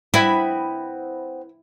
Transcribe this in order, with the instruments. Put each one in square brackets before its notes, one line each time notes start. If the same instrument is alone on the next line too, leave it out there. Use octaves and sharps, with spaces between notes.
[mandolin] B3 C4 B5 [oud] E4